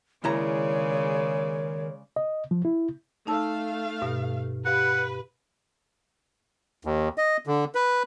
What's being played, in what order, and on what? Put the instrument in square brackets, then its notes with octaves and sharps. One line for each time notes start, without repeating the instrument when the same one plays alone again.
[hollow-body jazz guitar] D#2 E4 A#5 [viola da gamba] C#3 G#3 D5 [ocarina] A#4 [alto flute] C#5
[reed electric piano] D#5
F3
E4
[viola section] A3 F5 [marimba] D#4 A5 E6
[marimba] G2 B2
[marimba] G4 F5 [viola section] B4 [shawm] F#5
[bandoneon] D#2
D#5
D3
B4